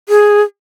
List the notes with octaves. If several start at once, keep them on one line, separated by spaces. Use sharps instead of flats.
G#4